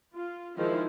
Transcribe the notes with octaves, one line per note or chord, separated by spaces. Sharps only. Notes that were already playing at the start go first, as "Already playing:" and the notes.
F4
D#3 F3 G#3 E4 C5